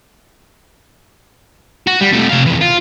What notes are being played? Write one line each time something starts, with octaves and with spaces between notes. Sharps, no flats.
F#4
G3
C3 A3
C3 F5
F2 E3
F4